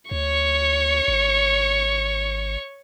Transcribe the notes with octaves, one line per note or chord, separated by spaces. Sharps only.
D2 C#5 C#6
G#1